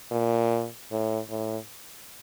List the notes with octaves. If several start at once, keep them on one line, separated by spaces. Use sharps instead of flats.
A#2
A2
A2